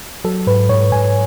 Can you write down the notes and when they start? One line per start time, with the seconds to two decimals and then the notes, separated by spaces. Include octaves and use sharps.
0.24 F#3 A4
0.47 G#2 B4
0.69 G#2 C#5
0.92 G#2 G#5